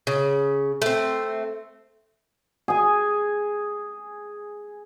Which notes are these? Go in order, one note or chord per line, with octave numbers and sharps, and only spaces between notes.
C#3
A3 C4
G#4 G#5